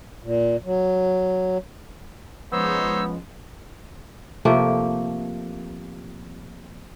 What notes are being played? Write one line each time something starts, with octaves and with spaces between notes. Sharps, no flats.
A#2
F#3
F3 G#3 B3 C#4 D#4 C5 C#5 E6
C3 F3 A3 A#3